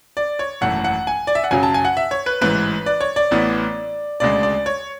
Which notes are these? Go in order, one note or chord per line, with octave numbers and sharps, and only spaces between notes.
D5
C#5
G#1 F#2 E3 A3 F#5
F#5
G#5
D5
E5
F#5
F#2 C#3 F#3 G#5
A5
G#5
F#5
E5
C#5
B4
A1 G#2 E3 B4
D5
C#5
D5
A1 A2 E3 B3
D2 C#3 G#3 D4 D5
D5
C#5